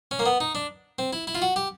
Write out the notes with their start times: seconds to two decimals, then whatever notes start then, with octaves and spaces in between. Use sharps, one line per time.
0.11 C#4
0.19 A#3
0.26 B3
0.40 D#4
0.55 D4
0.99 C4
1.13 E4
1.27 E4
1.35 F4
1.42 F#4
1.56 G4